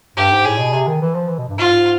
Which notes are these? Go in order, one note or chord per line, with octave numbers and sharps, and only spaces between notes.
G2 G4
G#2
A2 G#4
B2
C3
D#3
E3
F3
E3
B2
G2
G#2 F4
G#2